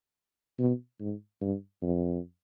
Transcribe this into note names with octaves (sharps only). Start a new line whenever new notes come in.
B2
G#2
G2
F2